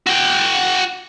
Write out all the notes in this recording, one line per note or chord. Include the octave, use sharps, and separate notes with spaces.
F#4 G5